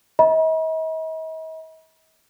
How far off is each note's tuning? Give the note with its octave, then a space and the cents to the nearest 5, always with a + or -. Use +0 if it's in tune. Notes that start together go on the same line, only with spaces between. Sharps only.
D#5 +45 B5 -45